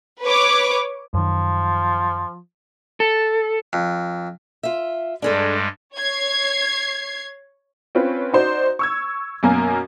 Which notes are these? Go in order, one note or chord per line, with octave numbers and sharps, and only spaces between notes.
B4 C#5 D6
F#2 D#3 F3
A4
F2
F4 E5
G2 G3 G#3 D4 G#4 A4
C#5 G#6 C7
C4 C#4 F4 B4
D#4 F#4 C5 D5
C#6 E6 G#6
F#2 B2 A#3 A#4 G#5 A#5